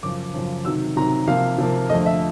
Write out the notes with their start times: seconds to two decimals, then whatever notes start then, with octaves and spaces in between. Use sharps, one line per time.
0.03 F#2 C#3 F3 D6
0.34 F#2 C#3 F3
0.65 C3 D#3 F#3 E6
0.97 C3 D#3 F#3 A#5
1.27 C3 F3 A#3 F5
1.58 C3 F3 A#3
1.90 F2 D3 F3 A3 D#5
2.06 E5